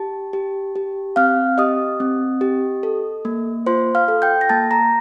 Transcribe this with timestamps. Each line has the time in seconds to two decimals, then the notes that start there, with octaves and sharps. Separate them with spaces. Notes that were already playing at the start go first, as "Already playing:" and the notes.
Already playing: G4 A5
0.33 G4
0.76 G4
1.16 C4 F5 F6
1.58 G4 D#5 D#6
2.00 C4
2.41 G4
2.83 A4
3.25 A#3
3.66 F4 C5 C6
3.95 F5 F6
4.08 A4
4.22 G5 G6
4.41 A#6
4.49 A#3 A5 A6
4.71 A#5 A#6